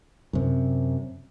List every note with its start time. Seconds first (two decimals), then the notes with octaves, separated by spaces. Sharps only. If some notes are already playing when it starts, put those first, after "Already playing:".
0.33 F#2 C3